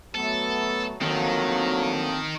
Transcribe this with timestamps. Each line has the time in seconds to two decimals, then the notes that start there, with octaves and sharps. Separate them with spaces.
0.15 F#3 A3 B3 A4
1.01 D2 D#3 F#3 A#3 C4 A4 F5